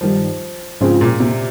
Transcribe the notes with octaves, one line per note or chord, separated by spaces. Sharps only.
G2 D#3 F3 G3
G#2 C#3 F3 C4 F4 G#4
A#2
C3